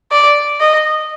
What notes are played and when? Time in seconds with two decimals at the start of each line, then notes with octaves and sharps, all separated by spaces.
0.11 D5
0.60 D#5